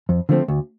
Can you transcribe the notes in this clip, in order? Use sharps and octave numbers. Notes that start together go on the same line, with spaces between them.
F2
D3 F3 A3 C4
D2